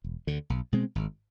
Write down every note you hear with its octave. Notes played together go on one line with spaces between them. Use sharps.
E1
D2 D3
B1
B2 G#3 C4
G#1